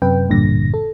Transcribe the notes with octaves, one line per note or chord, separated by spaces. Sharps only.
F#2 C3 B4 G5
A1 E2 G2 A#2 D3 A#6
A4